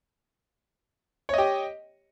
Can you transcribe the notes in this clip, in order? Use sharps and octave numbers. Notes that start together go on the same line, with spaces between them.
G4 C#5 D#5